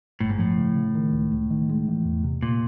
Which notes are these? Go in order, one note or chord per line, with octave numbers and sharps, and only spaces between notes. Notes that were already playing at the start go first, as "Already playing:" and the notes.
G1 A2
G#2
A2 F3
C#3
C#3
D#3
C#2
C#2
D#3
G#3
E3
E2
C3
A#2